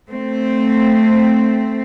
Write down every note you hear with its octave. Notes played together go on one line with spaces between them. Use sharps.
A3 C4